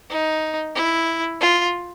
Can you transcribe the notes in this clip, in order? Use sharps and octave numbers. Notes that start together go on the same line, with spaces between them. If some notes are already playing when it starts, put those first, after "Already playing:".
D#4
E4
F4